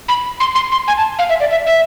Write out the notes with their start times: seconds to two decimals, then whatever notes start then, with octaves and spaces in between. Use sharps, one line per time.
0.08 B5
0.40 C6
0.55 C6
0.72 C6
0.88 G#5
0.97 A5
1.19 F5
1.29 E5
1.40 D5
1.51 E5
1.67 E5